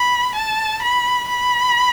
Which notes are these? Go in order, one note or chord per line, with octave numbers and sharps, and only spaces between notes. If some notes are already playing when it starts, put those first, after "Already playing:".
Already playing: B5
A5
B5
B5